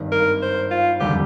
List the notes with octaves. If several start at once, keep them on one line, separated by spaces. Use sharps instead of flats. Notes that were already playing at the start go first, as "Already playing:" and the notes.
Already playing: G#1 G2 D#3
A#4
C5
F4
F1 D#2 D3 G3 G4